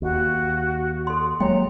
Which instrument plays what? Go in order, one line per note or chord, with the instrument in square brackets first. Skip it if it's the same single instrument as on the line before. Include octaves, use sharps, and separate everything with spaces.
[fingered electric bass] D#2 [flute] F#4
[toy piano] A4 C6
[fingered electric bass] F#3 G#3 A#3 [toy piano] C#5 G5 [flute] A#5